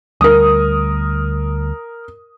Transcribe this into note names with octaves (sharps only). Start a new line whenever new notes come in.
D2 G3 A#4 D#6